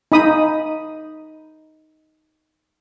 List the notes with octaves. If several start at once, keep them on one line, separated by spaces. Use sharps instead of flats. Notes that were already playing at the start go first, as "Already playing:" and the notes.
D#4 B5 D#6